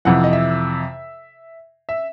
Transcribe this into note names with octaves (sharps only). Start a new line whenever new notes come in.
F2 C3 E3 F#5
D#5
E5
E5